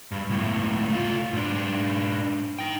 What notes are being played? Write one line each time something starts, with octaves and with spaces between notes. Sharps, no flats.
G2
C#2 A2
A3 F4
G#2 D4
D#4 G5